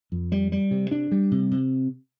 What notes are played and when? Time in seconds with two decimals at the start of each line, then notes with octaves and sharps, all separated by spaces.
0.12 F2
0.32 G3
0.52 G3
0.71 C3
0.91 D4
1.11 G3
1.31 C3
1.51 C3